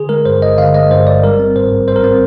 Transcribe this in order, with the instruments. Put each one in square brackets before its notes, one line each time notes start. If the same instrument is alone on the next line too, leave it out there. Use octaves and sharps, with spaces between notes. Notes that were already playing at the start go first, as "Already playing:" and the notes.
Already playing: [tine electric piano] D3 G#4
G#3 A#4
G2 C5
G1 D#5
D3 F5
G#3 D#5
G2 C5
G1 D5
G3 A#4
C4
G#2 C5
A#1
G3 C5
A#4
C4 C5